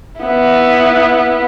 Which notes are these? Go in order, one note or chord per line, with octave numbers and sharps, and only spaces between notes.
B3 E4